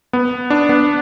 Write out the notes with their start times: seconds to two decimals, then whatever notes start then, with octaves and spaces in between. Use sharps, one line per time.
0.13 B3
0.50 D4
0.69 B3